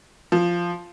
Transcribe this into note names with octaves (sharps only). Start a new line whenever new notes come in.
F3